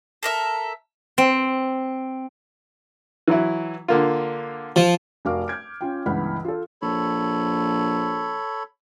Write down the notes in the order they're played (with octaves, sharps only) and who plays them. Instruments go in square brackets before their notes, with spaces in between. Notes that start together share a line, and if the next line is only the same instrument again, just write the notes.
[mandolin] A4 A#4 E5
[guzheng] C4
[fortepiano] E3 F#3 E4
D3 A#3 F4
[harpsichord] F3
[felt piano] F1 F#4 A#4 F5 D6 F6
F6 G6 G#6 D7
C#4 F4 G5
G1 C#2 E3 F#5 B5 F6
F4 A4
[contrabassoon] A#1 [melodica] A4 C#5 B5